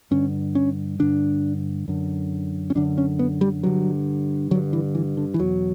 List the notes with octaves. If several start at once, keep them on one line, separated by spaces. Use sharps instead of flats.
G2 D3 C#4
C#4
G2 D3 D4
F#2 D3
C#4
F#2 D3 D4
C#4
B3
G3
G2 D3 F#3
G2 D3 F#3
E3
E3
D3
E3
E2 B2 F#3